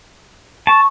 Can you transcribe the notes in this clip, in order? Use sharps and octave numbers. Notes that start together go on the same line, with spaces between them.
A5 C#6